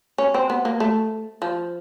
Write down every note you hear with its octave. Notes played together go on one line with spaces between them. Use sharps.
C#4
C4
B3
A#3
A3
F3